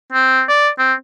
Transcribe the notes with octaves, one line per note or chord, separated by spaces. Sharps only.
C4
D5
C4